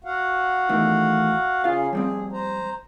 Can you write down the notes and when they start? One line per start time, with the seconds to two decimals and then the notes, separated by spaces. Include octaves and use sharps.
0.04 F#4 F5 F#5
0.69 E2 A2 D#3
1.64 C#3 C#4 F4 G#4 F5
1.93 F3 G3 C4 G#4
2.32 C5 A#5